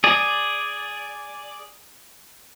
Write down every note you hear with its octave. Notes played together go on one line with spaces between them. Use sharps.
G#4 D5